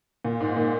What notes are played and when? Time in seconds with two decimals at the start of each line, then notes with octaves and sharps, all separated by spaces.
0.25 A#2
0.40 G#2
0.57 A#2